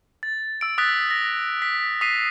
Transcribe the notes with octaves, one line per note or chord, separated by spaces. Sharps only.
A6
E6 D7
D#6 E6 F#6 A6 B6
A#6
B6
D#6 B6 C7 D#7